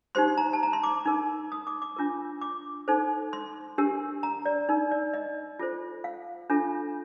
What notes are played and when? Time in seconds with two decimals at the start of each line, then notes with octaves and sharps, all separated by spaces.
0.15 D#4 G4 C5 C6
0.38 A#5
0.53 A5
0.63 A#5
0.73 C6
0.83 D6
1.05 D#4 A#4
1.52 D#6
1.67 D6
1.82 D6
1.96 D4 F4 A#4
2.41 D6
2.88 D#4 A4 C5
3.33 C6
3.78 D4 G4 A#4
4.23 A#5
4.46 D5
4.69 D#4 A#4
4.91 D5
5.14 D#5
5.59 F4 A4 C5
6.04 F5
6.50 D4 F4 A4